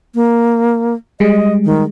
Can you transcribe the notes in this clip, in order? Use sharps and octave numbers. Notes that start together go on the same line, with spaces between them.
A#3
G3 G#3 D#5
D#3